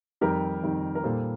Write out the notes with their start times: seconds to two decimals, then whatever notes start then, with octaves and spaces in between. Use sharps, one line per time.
0.21 F2 D#3 G3 G4 A#4
0.63 F2 D#3 G3
0.95 A#4
1.04 A#2 G3 A#3 A4 C5